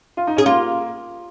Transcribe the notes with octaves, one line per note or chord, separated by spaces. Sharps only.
F4
D#4
C#4 G#4
A#3 F4